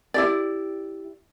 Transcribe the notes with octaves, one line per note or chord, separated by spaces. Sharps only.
E4 G4 D5